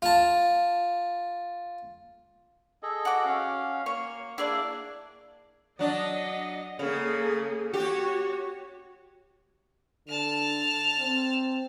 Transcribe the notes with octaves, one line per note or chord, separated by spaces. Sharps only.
F4 A5
G#4 A4 D#5
F#4 D6
C#4 F5
A#3 C#5
A#3 D4 E4 G#4 D5
F#3 D4 D#5
C#3 A#3 G#4 A4
F#4 G4 C#5
D3 A5 F6
C4